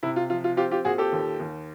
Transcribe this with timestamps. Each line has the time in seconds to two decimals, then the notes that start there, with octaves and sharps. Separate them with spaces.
0.03 C3 E4
0.16 F4
0.30 F3 F4
0.44 F4
0.57 C4 F4 G4
0.71 F4 G4
0.85 A#2 F#4 G#4
0.98 G4 A4
1.12 D#2
1.40 D#2